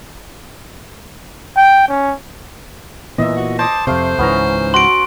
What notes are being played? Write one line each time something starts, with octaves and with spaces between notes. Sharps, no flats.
G5
C#4
A#2 E3 B3 D#5 E5
F#4
C5 A5 D6 D#6
F2 C3 A3 C5 F5
C#2 G#2 E3 B3 C#4 A#5
F#4 C6 D7